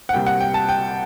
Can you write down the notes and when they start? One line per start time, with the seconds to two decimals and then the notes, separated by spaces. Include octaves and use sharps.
0.09 F#5
0.13 C2 C3 G3 A#3 G5
0.27 F#5
0.40 G5
0.54 A5
0.69 G5